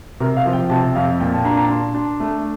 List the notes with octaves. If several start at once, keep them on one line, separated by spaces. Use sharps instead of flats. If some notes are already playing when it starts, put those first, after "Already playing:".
C3 A#4
F5
F3
G5
C3 A5
F2 F5
A#2 G5
A5
D4 A#5
A#5
D4 C6
D4
A3